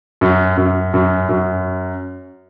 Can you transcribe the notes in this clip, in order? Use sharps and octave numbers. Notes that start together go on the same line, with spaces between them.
F#2
F#2
F#2
F#2